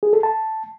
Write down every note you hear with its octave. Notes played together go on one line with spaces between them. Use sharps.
G#4
A4
A5